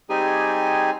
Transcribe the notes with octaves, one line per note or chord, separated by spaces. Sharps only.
G3 C4 D#4 G4 G#4 G#5